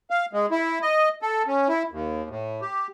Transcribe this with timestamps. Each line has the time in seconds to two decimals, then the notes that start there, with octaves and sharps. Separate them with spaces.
0.10 F5
0.33 G#3
0.51 E4
0.82 D#5
1.22 A4
1.48 C#4
1.69 E4
1.92 D#2
2.30 A2
2.61 G4